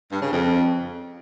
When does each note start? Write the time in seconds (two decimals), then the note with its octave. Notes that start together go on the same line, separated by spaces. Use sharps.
0.12 G2
0.22 C#3
0.32 F2